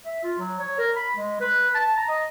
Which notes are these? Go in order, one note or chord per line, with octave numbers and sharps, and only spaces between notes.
E5
F4
F#3
C#5
A#4
B5
G#3
B4
A5
A#5
D#5